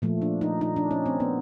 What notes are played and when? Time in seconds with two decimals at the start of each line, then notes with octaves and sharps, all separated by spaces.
0.02 A#2 F3 A3
0.22 D4
0.41 D#4
0.61 D#4
0.76 D4
0.91 C#4
1.06 C4
1.20 B3